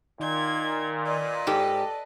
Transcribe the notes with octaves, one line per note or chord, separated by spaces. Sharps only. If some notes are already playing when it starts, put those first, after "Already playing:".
A#2 D#3 G#6
B4 D5 D#5
G#2 G4 A4